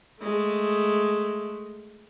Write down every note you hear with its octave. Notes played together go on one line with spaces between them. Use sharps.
G#3 A3